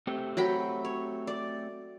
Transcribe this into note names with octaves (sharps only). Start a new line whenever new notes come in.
A3 C4 G4
F#3 G5 B5
C#5
D5